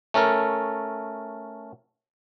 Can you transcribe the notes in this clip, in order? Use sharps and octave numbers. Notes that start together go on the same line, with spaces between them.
A3 C#4 A4 A#4